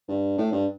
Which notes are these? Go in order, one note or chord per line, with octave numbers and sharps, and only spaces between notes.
G2
A2
G2